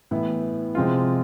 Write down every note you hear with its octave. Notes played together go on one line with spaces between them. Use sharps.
A2 E3 B3 E4
C3 F3 G#3 C4 F4